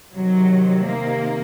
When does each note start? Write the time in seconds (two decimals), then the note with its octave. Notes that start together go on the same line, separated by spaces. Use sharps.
0.14 C3 D#3 F#3
0.85 A#3